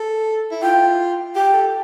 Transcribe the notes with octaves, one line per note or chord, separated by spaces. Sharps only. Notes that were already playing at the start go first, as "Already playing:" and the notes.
Already playing: A4
E4
F4 G5
G4 G5
A4